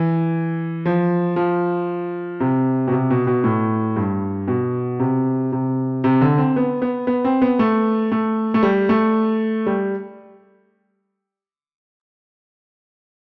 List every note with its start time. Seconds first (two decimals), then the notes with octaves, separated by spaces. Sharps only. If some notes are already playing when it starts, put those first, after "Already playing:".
Already playing: E3
0.86 F3
1.36 F3
2.40 C3
2.87 B2
2.92 C3
3.10 B2
3.27 B2
3.44 A2
3.96 G2
4.48 B2
4.99 C3
5.52 C3
6.04 C3
6.21 D3
6.38 C4
6.56 B3
6.82 B3
7.07 B3
7.24 C4
7.42 B3
7.59 A3
8.12 A3
8.54 A3
8.63 G3
8.89 A3
9.66 G3